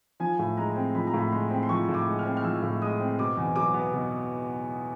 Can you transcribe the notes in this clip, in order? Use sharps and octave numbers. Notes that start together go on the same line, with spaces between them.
F3 G#5
A2
G#3 A#5
C4
F3 B5
A#5
A2 B5
G#3 C6
C4
C6
F3 C#6
A2
D6
G#3
F6
C4
F6
F3 E6
A2
G#3 D#6
C4
B2 D6
E2
F#3 D6
B3
B2